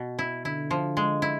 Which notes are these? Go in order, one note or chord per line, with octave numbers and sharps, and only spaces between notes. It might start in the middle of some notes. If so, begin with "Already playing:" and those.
Already playing: B2
E4
D3 E4
F3
G#3
E4